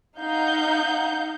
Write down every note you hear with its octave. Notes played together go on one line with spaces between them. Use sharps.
D#4 F5 F#5 G6